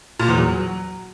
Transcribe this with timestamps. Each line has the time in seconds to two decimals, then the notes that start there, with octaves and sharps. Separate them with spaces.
0.19 A#2
0.28 E2
0.37 F#3